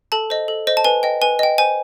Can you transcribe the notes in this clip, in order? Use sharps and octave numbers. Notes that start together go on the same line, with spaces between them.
A4 A5
C5 D#5
A4
C5 D#5
A5
B4 G#5
D#5 G5
B4 G#5
D#5 G5
C5 G#5